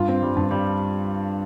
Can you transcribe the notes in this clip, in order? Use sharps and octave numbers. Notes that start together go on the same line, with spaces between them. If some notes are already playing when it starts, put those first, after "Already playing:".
Already playing: G2 F4
C4
G3
G2
G3